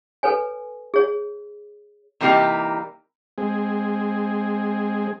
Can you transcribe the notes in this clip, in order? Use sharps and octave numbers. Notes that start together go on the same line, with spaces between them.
A4 B4 C#5 G#5
G#4 C#5
C3 E3 G3 A#3 D#4 G4
G#3 C4 G#4